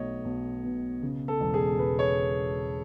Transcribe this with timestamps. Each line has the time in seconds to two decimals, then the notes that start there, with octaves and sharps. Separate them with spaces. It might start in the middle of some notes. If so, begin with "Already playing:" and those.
Already playing: B1 A3 C#5 D#5
0.25 B1
0.64 B2
1.02 C#3
1.28 A4
1.41 E1
1.54 G#4
1.79 E1 B4
1.99 C#5